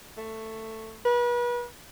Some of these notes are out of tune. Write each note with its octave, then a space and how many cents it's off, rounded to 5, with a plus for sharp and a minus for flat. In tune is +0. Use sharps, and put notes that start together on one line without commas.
A3 +10
B4 -35